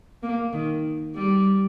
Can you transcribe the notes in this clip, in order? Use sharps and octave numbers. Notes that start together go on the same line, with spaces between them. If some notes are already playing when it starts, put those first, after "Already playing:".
A#3
D#3
G3